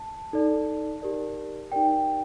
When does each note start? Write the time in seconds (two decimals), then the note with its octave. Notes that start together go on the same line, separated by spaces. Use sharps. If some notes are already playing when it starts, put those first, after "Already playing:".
Already playing: A5
0.33 D#4 A4 D5
1.02 D#4 G4 A#4 D5
1.72 D#4 G4 A#4 D5 G5